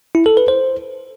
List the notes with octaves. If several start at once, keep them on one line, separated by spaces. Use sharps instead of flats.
E4
A4
B4
C5